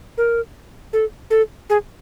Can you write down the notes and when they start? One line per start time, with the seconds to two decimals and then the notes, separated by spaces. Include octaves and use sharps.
0.18 A#4
0.93 A4
1.30 A4
1.70 G#4